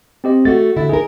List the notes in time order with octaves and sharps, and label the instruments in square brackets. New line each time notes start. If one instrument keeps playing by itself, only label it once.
[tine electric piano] C4 G4 D#5
[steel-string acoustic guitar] A3 F#4 [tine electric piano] A6
[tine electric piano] D3 E5 [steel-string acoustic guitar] E4 F#4
[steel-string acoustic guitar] D#4 A#4 [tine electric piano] G#4